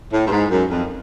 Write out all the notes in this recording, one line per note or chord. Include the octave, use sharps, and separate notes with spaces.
A2
G2
G#2
F#2
F2